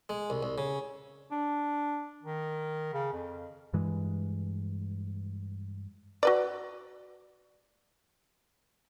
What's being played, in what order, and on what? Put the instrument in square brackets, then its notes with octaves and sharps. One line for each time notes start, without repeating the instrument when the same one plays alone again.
[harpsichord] G#3
C2
C2
C#3
[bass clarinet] D4
D#3
C#3
F2
[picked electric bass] G2 E3 G#3
[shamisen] F#4 B4 D5